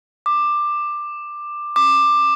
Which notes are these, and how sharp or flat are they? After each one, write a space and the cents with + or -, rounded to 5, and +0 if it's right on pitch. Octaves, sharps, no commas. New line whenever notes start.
D6 +15
D6 +15